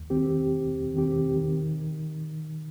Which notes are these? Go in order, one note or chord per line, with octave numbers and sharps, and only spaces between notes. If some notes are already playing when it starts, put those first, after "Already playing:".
Already playing: D#2
D#3 C4 G4
D#2
D#3 C4 G4
D#3